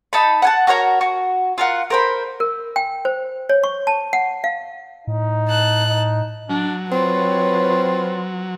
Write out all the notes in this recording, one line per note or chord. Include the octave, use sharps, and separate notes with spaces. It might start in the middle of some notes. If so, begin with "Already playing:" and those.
D#4 A5 B5
F#5 G#5 A5
F#4 A#4 C#5 A#5
F#4
F4 A#4 F#5
A#4 C5 B5
A#4
G5
C5
C#5
C#6
A5
F#5
F5
A2 D#4
A5 F#6
D#4
F#3 D4
C4 F4 B4 C#5